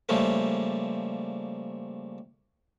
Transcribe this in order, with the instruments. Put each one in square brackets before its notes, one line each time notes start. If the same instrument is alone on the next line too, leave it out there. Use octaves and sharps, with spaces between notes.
[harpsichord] C#3 F3 G3 A3 A#3